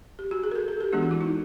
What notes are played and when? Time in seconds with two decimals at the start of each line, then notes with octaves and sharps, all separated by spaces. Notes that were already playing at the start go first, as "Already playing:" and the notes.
0.19 G4
0.31 F#4
0.44 G#4
0.51 A#4
0.56 A4
0.68 A4
0.81 G4
0.93 E3 G#3 B3 D4 F#4
1.03 F#4
1.11 E4
1.21 D#4